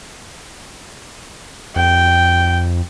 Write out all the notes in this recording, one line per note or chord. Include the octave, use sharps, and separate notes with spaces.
F2 G5